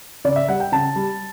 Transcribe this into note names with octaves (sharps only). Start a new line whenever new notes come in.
C#3 D5
E5
G3 F#5
G5
C#3 A5
G3